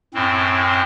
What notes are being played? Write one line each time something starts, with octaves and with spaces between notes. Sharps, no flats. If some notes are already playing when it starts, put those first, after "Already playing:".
F#2 A2 C4